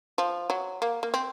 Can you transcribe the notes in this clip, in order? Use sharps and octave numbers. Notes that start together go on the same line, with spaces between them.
F3
F#3
A#3
A#3
C4